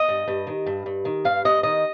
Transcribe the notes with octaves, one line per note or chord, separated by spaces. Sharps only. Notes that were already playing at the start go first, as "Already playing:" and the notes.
Already playing: D#5
G2
G2
D#3
G2
G2
D#3
G2 F5
G2 D#5
D#3 D#5